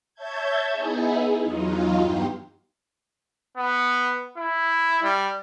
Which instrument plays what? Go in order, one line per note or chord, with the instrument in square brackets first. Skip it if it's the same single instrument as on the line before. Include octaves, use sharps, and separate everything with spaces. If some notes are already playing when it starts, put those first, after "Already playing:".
[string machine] C#5 E5 A5 G6 G#6
B3 D#4 E4 G#4
E2 F#3 D#4 F4
G2 B3 G4 C6
[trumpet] B3
E4
G3